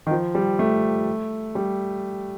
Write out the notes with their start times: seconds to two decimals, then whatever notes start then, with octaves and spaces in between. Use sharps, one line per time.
0.07 D#3
0.11 F3
0.35 G3
0.59 A3
1.55 G3